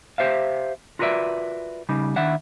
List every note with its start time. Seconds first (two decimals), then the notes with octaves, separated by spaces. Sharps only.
0.18 G4 C5 E5 F5
0.99 F4 F#4 A#4 B4 D5 E5
1.89 C#3 G3 D#4
2.16 D#3 D4 E4 E5 F#5